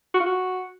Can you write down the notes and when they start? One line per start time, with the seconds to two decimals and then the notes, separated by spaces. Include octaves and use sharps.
0.15 F#4
0.20 F4
0.26 F#4